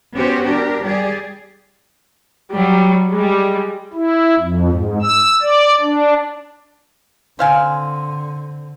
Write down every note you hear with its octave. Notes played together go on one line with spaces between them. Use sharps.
B3 C#4 F#4 G4 C5
D4 G4 A#4
G3 G4 G#4 D5
F#3 G3
G3 G#3
E4
F2
G#2
E6
D5
D4
D3 C4 F5 G#5